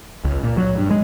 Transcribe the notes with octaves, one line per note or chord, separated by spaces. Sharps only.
C#2
A#2
F#3
G2
G#3